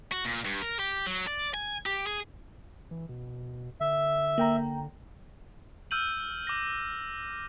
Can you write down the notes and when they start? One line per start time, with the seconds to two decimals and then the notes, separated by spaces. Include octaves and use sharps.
0.12 F#4
0.25 A#2
0.45 G2
0.62 A#4
0.79 G4
1.06 F#3
1.27 D5
1.54 G#5
1.86 G4
2.06 G#4
2.91 E3
3.09 B2
3.81 D3 E5
4.38 A#3 G5 A#5
5.91 E6 F6 G6 D#7 F#7
6.47 D6 A#6